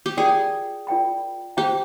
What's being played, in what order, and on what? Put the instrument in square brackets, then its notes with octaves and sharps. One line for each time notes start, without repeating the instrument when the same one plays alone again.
[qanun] G4
[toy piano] F4 A#4 D5 G5 B5 [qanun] G#4
[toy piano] F4 A#4 D5 G5 B5
[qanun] G4 [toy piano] G#4 C5 E5 G5 A#5